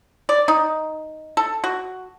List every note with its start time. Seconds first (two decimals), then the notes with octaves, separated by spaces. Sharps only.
0.29 D5
0.48 D#4
1.37 A4
1.64 F#4